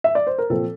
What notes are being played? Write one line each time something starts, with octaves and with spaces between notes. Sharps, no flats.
E5
D5
C5
A#4
A#2 F3 C4 A4